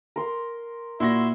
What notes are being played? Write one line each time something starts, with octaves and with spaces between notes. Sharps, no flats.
A#4 C6
A#2 E4 F#4 E5 C6 A#6